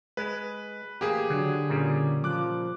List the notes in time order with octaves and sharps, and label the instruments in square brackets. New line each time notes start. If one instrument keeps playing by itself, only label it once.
[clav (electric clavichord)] G#3 [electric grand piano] B4
[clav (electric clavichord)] A1 A#3 [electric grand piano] G4 G#4
[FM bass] D3 [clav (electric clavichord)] F#3
[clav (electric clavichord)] A#2 C#3 G3
[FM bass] F3 [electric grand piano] D6 F#6